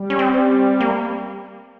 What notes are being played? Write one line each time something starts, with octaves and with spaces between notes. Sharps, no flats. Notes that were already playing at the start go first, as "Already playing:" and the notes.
Already playing: G3
C#4
C4
A#3